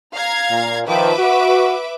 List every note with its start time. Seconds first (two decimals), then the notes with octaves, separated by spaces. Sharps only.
0.15 F5 A#5 G#6
0.50 A#2
0.88 D#3 F3 B4 E5 D6
1.18 F#4